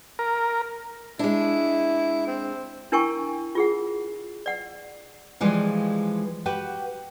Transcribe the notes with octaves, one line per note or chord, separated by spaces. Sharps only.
A#4
G#3 D4 E4
C4
D4 E4 A#4 G5 G#5 C#6
F4 G#4 F#5
D5 F#5
E3 F3 G3 G#3 F4
F#4 G4 B4